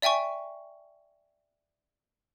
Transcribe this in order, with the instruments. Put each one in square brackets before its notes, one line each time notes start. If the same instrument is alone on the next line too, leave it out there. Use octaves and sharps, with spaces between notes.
[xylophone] D5 E5 G5 G#5 C#6